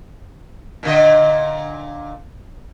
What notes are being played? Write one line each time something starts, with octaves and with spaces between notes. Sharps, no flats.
A#2 D3 D#5